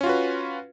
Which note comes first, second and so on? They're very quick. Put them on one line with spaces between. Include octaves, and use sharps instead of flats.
C#4 F4 F#4 B4